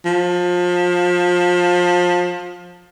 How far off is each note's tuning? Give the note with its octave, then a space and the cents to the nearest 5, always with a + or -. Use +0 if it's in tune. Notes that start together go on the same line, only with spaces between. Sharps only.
F3 +25